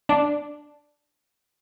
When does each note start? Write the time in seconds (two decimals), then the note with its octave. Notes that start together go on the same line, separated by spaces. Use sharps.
0.09 D4